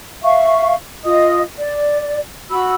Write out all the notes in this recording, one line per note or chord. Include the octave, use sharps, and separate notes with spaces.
E5 F5 C#6
F4 D#5 D#6
D5
F#4 B5 E6